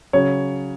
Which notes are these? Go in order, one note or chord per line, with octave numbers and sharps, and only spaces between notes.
C#3 F#3 C#5